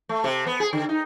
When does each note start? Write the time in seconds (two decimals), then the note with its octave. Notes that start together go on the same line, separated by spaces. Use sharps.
0.09 A3
0.24 C3
0.47 B3
0.60 G#4
0.73 D3
0.89 D#4